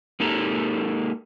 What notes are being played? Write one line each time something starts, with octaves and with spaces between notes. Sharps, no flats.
G#3 A#3 D#4 G4 A4 A#5